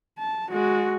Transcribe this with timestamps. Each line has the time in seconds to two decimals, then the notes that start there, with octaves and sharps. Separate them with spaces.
0.18 A5
0.52 G#3 F#4